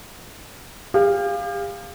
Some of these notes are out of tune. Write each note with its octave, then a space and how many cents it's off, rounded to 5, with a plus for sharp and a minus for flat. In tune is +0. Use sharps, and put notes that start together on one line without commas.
G4 +40 F5 +0